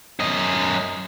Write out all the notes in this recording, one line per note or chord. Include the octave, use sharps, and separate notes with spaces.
F#2 D#5